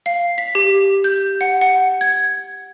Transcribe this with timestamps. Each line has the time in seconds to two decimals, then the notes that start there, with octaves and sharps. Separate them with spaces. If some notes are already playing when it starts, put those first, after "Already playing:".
0.06 F5
0.38 B6
0.55 G4
1.04 G6
1.41 F#5
1.61 F#5
2.01 G#6